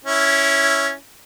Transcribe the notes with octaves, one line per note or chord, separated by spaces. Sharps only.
C#4 E4